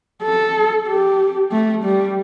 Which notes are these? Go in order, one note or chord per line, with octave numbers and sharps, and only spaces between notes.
A4
G4
A3
G3